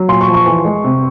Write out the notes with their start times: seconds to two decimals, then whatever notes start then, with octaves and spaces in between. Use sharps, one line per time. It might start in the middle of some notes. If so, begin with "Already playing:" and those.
Already playing: F#3
0.08 A#2 C6
0.21 C#6
0.28 F3
0.34 C#6
0.46 E3
0.65 G#3
0.84 C3